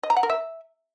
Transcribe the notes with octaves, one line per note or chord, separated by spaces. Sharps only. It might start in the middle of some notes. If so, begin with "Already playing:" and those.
D#5
A#5
F#5
A#4
E5